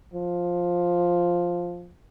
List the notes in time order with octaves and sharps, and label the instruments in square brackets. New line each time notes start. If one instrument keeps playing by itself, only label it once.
[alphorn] F3